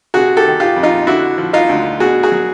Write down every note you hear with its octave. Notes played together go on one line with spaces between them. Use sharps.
C3 F#4 G#4
G4 A4
D#3
F4 G4
F2
D#4 F4
D3 E4 F#4
F3
D#4 F4
D2
B2 F#4 G#4
F#4 G#4
F#3